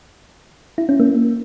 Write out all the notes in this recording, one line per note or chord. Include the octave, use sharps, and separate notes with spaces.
E4
C#4
A#3